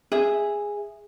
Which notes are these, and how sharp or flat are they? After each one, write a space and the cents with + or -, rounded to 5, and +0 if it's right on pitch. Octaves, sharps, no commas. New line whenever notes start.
G#4 -10 E5 +0